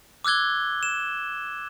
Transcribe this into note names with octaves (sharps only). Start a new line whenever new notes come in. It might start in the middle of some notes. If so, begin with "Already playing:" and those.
D6 E6 F#6 G#6 G7
E7